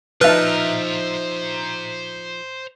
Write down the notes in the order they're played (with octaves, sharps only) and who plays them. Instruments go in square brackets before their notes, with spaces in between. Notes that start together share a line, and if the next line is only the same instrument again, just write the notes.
[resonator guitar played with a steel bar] F3 D#4 [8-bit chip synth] B4 [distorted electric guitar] C5 A#5 [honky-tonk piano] E5 F6